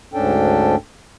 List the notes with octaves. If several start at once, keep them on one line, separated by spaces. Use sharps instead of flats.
D2 G#2 C#4 D4 A4 G5